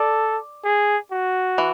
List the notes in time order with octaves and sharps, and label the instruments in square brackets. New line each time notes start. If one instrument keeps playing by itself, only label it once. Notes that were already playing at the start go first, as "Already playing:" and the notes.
Already playing: [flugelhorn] A4 [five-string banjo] D5
[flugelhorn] G#4
F#4
[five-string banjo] E3